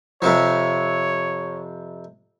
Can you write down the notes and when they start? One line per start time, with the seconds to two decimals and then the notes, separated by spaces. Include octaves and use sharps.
0.22 F2 C3 F3 C#5